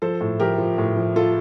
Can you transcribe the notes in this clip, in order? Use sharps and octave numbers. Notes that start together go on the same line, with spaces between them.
F3 A4 C5
A2
F3 G4 A#4
F3
A2
F3
F3 F4 A4